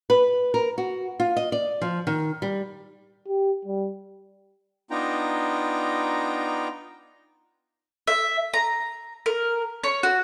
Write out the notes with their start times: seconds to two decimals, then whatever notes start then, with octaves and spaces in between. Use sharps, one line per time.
0.10 B4
0.54 A#4
0.78 F#4
1.20 F4
1.37 D#5
1.52 D5
1.81 F3
2.07 D#3
2.42 G3
3.28 G4
3.65 G3
4.91 B3 D4 D#4 F4 G5 A#5
8.07 E5
8.54 A#5
9.26 A#4
9.83 C#5
10.03 F#4